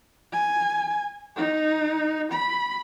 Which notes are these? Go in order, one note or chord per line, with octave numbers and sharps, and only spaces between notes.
G#5
D#4
B5